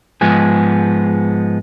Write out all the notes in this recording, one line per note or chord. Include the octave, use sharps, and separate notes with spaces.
G#2 F3 G#3 B3 G#4